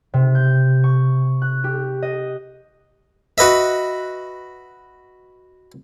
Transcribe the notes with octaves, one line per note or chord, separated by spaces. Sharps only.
C3
G6
C#6
F#6
G4
D#5
F#4 B4 D#5 E5